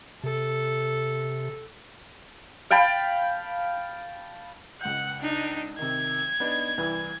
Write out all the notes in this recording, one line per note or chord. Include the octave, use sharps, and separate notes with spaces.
C3 A4
F5 G5 A5 B5
C#2 F#5 G6
D4 D#4
C3 D#3 G#6
B3 D4 D#4
C2 E3 B4